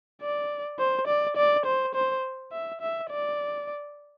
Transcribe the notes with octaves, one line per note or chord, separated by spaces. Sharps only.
D5
C5
D5
D5
C5
C5
E5
E5
D5